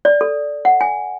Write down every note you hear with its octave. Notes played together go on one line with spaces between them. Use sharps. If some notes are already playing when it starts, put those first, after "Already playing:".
D5
A4
F#5
G#5